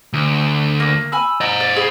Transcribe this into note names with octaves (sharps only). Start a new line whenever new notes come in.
D2
A#3
G#5 B5 E6
C5 D#5 A#5
D5
G#4 B5